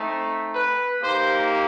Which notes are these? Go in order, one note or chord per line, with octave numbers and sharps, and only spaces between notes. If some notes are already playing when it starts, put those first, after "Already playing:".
Already playing: A3 C4 D#4
B4
A#3 D#4 G4 C5